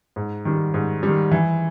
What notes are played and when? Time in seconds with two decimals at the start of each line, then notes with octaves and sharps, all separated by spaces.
0.16 G#2
0.45 D#3 G3
0.74 G#2
1.03 D#3 G3
1.31 E3